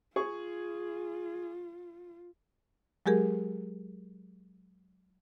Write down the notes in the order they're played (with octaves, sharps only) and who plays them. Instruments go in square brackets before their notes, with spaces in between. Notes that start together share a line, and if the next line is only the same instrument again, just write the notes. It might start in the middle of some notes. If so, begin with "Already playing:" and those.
[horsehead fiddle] F4 [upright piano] G#4 C#6
[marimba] F#3 G#3 G4 G#4 A#4